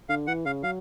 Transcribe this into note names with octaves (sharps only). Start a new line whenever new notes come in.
D3 F5
E3 F#5
C#3 F5
F#3 F5